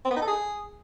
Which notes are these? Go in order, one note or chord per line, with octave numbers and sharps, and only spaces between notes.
C4
B3
D#4
A4
G#4